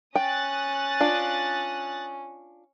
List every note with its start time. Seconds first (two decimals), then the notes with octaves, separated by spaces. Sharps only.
0.15 C#4 G5 D#6 F#6 A6
1.00 D4 F4